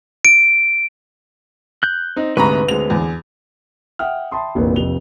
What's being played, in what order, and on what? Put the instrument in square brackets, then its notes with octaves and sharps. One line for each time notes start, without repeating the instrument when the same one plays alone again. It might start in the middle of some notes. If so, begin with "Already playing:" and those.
[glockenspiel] D7
[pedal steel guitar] F#6 G6
[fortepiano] C4 D#4
[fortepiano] D2 G#2 C3 [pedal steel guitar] B4 [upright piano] A#5 B5 C#6
[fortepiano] D2 G#3 C4 [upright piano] F7
[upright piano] E2
[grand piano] E5 F#5 G5 D#6 F6
E5 G5 A5 B5 C6 D#6
F1 A#1 E3 A#3 A#4 B4
F1 F2 C3 F7 G7